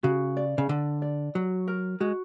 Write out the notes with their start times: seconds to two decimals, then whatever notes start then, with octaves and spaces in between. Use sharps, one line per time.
0.03 C#3 F#4
0.37 D5
0.58 C#3
0.69 D3 D5
1.02 D5
1.35 F#3 F#4
1.68 A#4
2.00 G#3 F#4